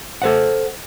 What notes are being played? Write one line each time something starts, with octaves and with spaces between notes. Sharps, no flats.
A4 C5 F#5